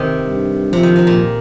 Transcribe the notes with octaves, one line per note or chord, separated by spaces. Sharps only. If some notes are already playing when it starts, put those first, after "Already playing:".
Already playing: C3 D#3
G2
C3 F3
D#3
C3
A#2